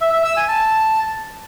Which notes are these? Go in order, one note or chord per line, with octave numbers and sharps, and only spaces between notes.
E5
E5
E6
G#5
A5